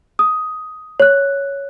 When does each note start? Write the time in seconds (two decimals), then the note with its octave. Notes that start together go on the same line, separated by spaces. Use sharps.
0.19 D#6
1.00 C#5 F#6